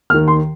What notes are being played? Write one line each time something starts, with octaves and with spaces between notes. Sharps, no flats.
D#2 D#3 F6
C6